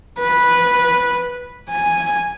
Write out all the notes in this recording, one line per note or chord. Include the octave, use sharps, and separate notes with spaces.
B4
G#5